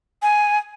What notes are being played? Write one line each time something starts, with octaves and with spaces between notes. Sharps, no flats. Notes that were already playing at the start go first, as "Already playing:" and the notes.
G#5